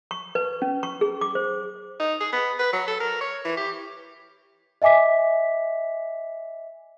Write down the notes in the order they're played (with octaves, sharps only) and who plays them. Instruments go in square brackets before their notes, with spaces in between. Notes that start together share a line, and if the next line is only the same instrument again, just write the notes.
[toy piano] C#6
B4
C#4
C#6
G#4
D6
C5
[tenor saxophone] D#4
G#4
B3
B4
F#3
A4
A#4
C#5
E3
G4
[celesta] D#5 E5 G#5 D6 B6